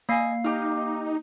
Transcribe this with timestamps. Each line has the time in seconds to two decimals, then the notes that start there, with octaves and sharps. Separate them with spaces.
0.09 A#3 D#5 F5 G#5 C7
0.44 D#4 G4 F6